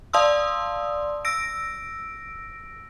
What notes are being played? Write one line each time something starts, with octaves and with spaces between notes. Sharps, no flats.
D5 F5 A5 C6 D#6 E6
E6 A#6 D7